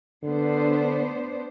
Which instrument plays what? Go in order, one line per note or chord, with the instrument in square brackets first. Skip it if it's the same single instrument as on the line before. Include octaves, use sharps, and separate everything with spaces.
[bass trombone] D3 [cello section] B3 D4 C5